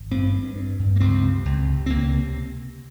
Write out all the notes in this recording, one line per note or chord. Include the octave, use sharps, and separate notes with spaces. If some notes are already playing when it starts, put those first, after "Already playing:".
Already playing: G#1
G2 C4
G2
G2
G2
A#3
C#2 C4
C3
C#2
C3
C4
C#2 A#3
C3